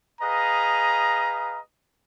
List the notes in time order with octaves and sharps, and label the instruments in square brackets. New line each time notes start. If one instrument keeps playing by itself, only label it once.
[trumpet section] G#4 B4 D#5 F5 A#5